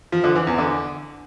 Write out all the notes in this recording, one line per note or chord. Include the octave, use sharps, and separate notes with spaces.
F3
D3
E3
E2
D3